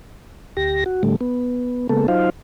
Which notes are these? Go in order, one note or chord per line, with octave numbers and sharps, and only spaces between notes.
D2 G4 A#6
F#4
A2 D3 G3 A3
B3
C#3 G#3 A#3 B3 A4
F#3 D#4 F4 C5 F5